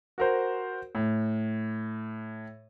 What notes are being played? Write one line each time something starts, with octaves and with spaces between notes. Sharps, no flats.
F#4 A#4 C5
A2